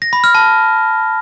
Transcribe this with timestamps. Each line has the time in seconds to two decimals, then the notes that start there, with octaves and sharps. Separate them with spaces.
0.02 A#6
0.13 B5
0.24 F6
0.35 A5